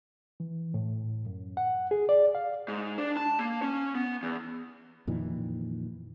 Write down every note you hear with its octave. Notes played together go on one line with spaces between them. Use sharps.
E3
A2
F#2
F#5
G#4
D5
F5
G#2
D4
A5
A#3
C#4
B3
E2
F2 A#2 D#3 E3